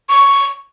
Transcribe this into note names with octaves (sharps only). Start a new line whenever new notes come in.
C#6